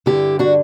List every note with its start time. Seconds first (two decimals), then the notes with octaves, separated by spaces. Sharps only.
0.06 G2 D3 E4 G4
0.39 D4 F#4